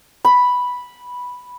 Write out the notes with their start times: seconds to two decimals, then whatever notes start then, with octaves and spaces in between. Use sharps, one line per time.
0.25 B5